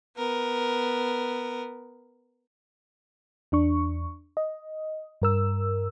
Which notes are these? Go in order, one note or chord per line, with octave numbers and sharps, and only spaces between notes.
B3 A#4
E2 D4 C#6
D#5
G2 A#4 E6